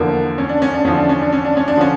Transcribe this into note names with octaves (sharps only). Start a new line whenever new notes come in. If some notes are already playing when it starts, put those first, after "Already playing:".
Already playing: E2 D3 F3 A#3
C#4
D4
C#4
D4
E2 D3 F3 C#4
D4
C#4
D4
C#4
D4
C#4
D4
D3 F3 C#4